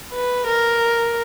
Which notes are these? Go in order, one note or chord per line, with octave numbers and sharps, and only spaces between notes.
B4
A#4